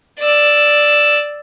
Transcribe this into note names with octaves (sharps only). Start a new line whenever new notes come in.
D5 E6